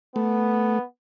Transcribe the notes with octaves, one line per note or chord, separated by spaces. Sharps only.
A3 B3